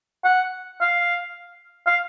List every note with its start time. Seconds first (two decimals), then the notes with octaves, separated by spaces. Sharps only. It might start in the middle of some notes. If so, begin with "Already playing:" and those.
0.25 F#5
0.81 F5
1.87 F5